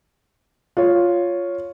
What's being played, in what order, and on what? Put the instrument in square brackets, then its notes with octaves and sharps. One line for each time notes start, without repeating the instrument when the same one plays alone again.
[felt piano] F4 C#5